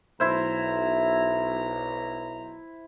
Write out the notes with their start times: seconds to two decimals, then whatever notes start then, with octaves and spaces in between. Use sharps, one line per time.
0.20 B1 E4 C5 A#5